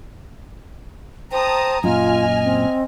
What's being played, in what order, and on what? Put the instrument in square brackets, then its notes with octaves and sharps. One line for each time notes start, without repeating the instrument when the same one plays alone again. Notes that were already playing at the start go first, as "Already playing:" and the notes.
[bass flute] C5 [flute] G5 [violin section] A5 A#5 D#6
[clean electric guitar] F#2 A#2 [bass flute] F4 [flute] D#5 [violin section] G#5 F6
[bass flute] C4